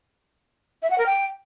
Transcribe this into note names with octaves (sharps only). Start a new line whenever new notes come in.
E5
F#5
A#4
G5